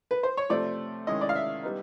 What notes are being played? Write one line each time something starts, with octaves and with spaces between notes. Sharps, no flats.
B4
C5
C#5
C3 F3 A3 C4 D5
D#3 G#3 C#4 E4 D#5
D5
F5
E5
G3 B3 D#4